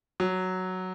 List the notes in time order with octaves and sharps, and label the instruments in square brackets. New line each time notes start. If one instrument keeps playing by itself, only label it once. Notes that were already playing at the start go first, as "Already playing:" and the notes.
[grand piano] F#3